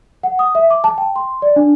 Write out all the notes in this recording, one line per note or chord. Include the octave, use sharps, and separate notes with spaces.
F#5
D#6
E5
D6
A5
G5
C6
D5
D4